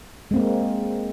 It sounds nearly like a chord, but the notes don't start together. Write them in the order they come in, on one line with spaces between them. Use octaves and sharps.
G#3 C4 A#3